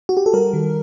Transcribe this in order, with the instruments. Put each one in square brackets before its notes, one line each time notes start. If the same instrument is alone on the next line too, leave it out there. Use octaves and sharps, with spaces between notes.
[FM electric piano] F#4
G4
A4
G3 A#4
D#3